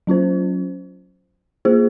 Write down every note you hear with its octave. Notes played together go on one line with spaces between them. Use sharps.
F#3 C#4 F4 C5
A#3 F4 G#4 C5